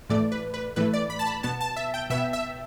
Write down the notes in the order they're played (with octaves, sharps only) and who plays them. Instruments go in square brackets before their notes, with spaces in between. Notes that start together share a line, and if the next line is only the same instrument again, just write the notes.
[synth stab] A2 E3 A3 D5
B4
B4
A2 E3 A3 B4
D5
B5
A5
B5
B2 B3 A5
A5
E5
G5
B2 B3 E5
E5